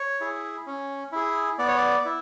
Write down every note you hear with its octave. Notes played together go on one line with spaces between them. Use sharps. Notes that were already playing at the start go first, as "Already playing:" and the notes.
Already playing: C#5
E4 G#4
C#4
E4 G#4
B3 D5
C#5
D5
E4